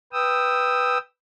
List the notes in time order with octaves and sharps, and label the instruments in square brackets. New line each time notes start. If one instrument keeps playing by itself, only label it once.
[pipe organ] B4 G5 D#6 E6